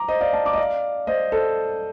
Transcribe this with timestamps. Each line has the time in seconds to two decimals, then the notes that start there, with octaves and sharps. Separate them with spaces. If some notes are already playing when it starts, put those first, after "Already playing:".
Already playing: A#5 D6
0.08 C5 D#5
0.21 D5 F5
0.33 F5 A5
0.46 A#5 D6
0.53 D#5
0.58 D5 F5
1.07 C5 D#5
1.32 A4 C5